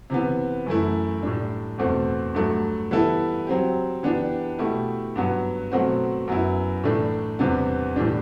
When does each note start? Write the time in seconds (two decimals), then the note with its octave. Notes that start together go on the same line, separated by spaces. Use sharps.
0.10 C3 E3 B3
0.66 F#2 E3 A3 E4
1.23 A2 G3 D4
1.78 E2 B2 A3 C4
2.34 G2 F#3 A3
2.91 E3 G3 B3 E4 A4
3.47 F#3 C4 G4
4.03 E3 B3 D4 G4
4.58 B2 A3 E4 G4
5.16 G2 F#3 B3
5.72 B2 F#3 A3 C4 F#4
6.28 F#2 F#3 B3 E4
6.84 A2 E3 A3 D4
7.39 E2 C3 G3 B3 D4
7.96 A2 E3 G3 D4